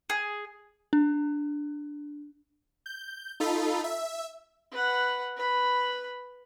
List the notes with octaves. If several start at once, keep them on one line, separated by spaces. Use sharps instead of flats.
G#4
D4
G6
D#4 F4 A4 B5
E5
B4 F#5
B4 B5